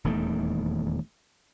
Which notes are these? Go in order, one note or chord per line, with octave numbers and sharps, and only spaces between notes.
D#1 E2 D#3 A3